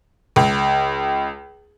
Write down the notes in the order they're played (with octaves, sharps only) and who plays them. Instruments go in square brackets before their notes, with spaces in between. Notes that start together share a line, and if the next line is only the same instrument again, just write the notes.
[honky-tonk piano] C#2